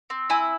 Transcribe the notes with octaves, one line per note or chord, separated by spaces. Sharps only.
C4
E4 G#5